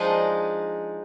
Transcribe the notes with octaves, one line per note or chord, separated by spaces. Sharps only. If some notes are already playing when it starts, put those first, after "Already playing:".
Already playing: F3 G#3 D4 D#4 D#5